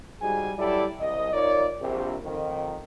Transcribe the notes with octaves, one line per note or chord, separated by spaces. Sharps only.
G#2 G3 F#4 G#4 G#5
F#3 G3 E4 G4 A4 D5
C2 D#5
D#4 F4 A#4 C#5 D5
A#1 C3
F2 D#3